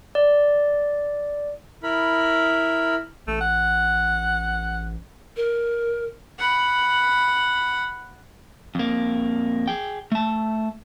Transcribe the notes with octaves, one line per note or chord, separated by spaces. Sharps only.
D5
E4 A#4 B5
A1 A3
F#5
A#4
F#5 B5
F2 A#3
G#4 G5
A3 A5